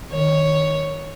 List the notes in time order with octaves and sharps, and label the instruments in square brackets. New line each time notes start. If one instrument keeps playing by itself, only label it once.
[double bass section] D#3 [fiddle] C#5